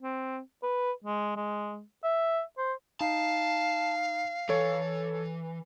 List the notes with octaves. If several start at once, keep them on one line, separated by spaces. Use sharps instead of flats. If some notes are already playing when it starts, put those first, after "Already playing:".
C4
B4
G#3
G#3
E5
C5
D#4 F5 A5
E3 A4 C#5